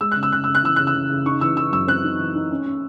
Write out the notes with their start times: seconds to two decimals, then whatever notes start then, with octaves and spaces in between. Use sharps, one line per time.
0.01 G#3 E6
0.11 C#3 F#6
0.23 E6
0.32 C#3 F#6
0.44 C#3 E6
0.55 F#6
0.63 E3 E6
0.76 C#3 F#6
0.87 E6
0.94 C#3
1.10 C#3
1.26 D#4 C#6
1.41 E3 E6
1.57 E3 E6
1.72 F#2 E6
1.88 C4 F#6
2.04 D#4
2.19 E3
2.35 D#4
2.51 C#4
2.66 C#4